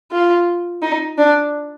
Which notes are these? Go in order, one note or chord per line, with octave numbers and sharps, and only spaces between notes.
F4
D#4
D4